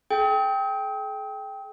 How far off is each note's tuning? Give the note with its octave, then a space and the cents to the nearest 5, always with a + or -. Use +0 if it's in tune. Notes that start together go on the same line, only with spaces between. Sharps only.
G#4 +45 G5 +0